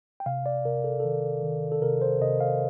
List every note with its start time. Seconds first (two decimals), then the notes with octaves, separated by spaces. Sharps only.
0.20 G5
0.26 C3 F5
0.46 D5
0.65 C3 A#4
0.84 A4
1.00 D#3 A4
1.43 D#3
1.72 A4
1.82 C3 A#4
2.02 C5
2.21 C3 D#5
2.40 F5